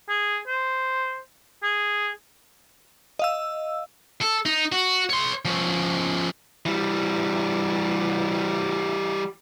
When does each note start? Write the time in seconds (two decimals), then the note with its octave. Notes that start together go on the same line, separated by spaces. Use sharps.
0.09 G#4
0.47 C5
1.62 G#4
3.19 D#5 F5 E6
4.21 A4
4.46 D#4
4.72 F#4
5.09 C#5 C6
5.45 F3 C#4
6.66 E3 G3